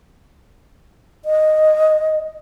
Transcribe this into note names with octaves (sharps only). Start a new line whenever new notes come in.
D#5